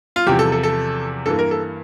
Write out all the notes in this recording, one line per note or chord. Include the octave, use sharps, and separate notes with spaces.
F4
E2 C3 F3 G4
A4
A4
A4
G2 E3 A#3 A4
A#4
A4